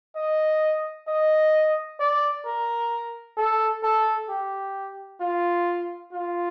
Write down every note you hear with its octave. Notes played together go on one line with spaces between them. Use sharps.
D#5
D#5
D5
A#4
A4
A4
G4
F4
F4